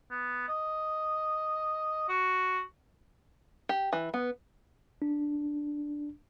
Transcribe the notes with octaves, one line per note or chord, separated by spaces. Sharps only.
B3
D#5
F#4
G4
E3
B3
D4